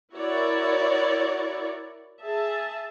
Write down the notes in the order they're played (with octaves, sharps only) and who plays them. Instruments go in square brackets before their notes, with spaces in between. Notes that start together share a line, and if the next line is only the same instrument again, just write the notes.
[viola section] E4 F#4 A#4 C#5 D5
G#4 E5 A5